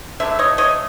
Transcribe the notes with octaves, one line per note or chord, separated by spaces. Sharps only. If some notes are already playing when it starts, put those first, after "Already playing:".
D3 F#3 A3 E5
C#5 D#5
C#5 D#5